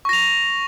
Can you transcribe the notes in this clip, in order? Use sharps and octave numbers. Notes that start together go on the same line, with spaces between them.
C#6 A#6 F7